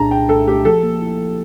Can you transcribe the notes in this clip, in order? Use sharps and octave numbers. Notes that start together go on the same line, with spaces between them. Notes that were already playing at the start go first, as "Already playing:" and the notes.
Already playing: C2 A#2 D4 A5 A#5
C2 G5
C2 A4
A3 G4
F3 A4
A#3
E4
F3